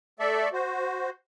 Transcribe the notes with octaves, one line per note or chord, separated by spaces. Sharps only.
A3 A4 D5 E5
F#4 C5